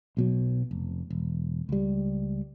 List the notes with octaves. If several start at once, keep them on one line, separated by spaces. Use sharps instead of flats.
B1 B2 F#3
F1
E1
C#2 G3